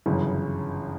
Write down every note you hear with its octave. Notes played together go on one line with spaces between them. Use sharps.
G1 F#2 C#3 E3